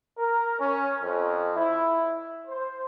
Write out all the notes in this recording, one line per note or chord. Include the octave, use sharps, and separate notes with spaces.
A#4
C#4
F2
E4
C5